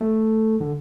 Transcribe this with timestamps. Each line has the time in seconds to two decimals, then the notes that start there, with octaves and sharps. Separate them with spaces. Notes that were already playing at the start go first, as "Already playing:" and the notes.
0.01 A3
0.60 D3